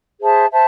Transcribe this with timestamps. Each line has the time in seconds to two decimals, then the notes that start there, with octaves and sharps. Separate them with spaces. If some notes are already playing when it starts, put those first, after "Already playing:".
0.19 G#4 C5 E5 A5
0.52 C5 E5 A5